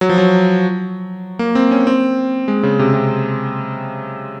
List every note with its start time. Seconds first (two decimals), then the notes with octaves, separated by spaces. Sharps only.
0.01 F#3
0.09 F3
0.18 F#3
1.39 A#3
1.55 C4
1.71 C#4
1.87 C4
2.48 G#3
2.63 C#3
2.79 C3
2.94 C3